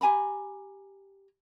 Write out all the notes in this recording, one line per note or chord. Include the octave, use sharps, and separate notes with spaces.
G4 G#5 A#5 B5